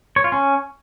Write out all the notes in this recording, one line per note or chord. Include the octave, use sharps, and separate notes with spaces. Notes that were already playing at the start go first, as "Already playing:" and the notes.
C#5
F4
C#4